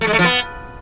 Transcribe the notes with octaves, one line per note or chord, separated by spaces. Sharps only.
A3
G#3
A3
F3
B3